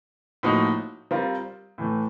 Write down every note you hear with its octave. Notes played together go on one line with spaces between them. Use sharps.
A2 F3 A#3 D#4 F#4
G3 C4 F4 A#4
A2 E3 A3